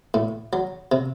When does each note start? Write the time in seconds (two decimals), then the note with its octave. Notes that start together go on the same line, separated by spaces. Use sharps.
0.14 A2
0.53 F#3
0.92 C3